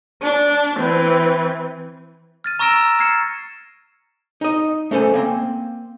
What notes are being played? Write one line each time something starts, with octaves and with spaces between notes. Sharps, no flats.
D4
E3 C4
F6 A6 D#7
A#5 C#6 E6 A#6 D7 E7
F6 G#6 A6 C7 C#7 E7
D#4 D#5
A3 C#4 A4 C5 G#5
A#3 C4